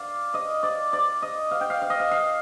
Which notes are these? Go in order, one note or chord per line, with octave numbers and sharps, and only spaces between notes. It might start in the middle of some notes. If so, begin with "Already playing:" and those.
Already playing: D5 F5
D#5
D5
D5
D#5
F5
G5
F5
F5
D#5
F5
F5